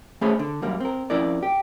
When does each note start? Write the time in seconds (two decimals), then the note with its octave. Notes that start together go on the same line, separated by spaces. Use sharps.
0.21 A3 C#4 G#4 C5 C#5 B5
0.39 D3
0.62 F#2 G3 A#3
0.80 C4 A#4
1.10 F2 C#4 E4 A#4 D5
1.43 G4